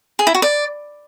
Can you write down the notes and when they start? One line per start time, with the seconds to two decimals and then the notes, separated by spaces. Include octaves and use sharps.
0.19 G#4
0.27 E4
0.35 F#4
0.42 D5